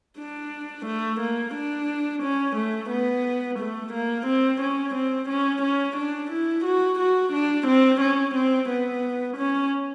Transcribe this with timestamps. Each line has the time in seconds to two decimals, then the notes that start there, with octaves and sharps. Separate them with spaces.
0.19 D4
0.86 A3
1.20 A#3
1.54 D4
2.23 C#4
2.56 A3
2.90 B3
3.59 A3
3.93 A#3
4.26 C4
4.60 C#4
4.94 C4
5.29 C#4
5.62 C#4
5.96 D4
6.31 E4
6.64 F#4
6.99 F#4
7.32 D4
7.67 C4
8.01 C#4
8.35 C4
8.69 B3
9.37 C#4